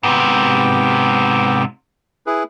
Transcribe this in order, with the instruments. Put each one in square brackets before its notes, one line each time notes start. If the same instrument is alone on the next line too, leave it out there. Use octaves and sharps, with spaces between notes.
[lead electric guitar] G#2 C3 [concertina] B3 G5 D6
[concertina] E4 G#4 B4